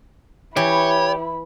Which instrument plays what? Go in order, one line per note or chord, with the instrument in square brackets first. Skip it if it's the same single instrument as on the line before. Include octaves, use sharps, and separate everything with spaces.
[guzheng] E3 [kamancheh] E4 B5 [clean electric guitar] G4 [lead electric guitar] C#5